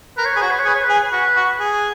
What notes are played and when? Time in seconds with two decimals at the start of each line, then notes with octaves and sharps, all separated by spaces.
0.17 A#4 B4
0.25 C#5
0.34 G#4 B4
0.41 F#4 C#5
0.51 B4
0.60 C#5
0.65 G#4
0.68 B4
0.75 C#5
0.84 B4
0.89 G#4
1.12 F#4 B4
1.36 F#4
1.59 G#4